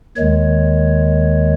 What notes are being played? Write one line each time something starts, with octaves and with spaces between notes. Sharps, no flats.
D#2 D#3 G#3 C#5